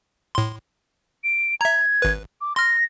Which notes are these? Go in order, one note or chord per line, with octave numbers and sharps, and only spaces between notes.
A2 C6
D7
E5 A#5 G#6
G#1 B4
D6
C6 F6 A#6